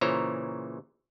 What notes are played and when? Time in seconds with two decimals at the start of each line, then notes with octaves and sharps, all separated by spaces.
0.01 A#2 C#3 E3 C5 C#5 A#5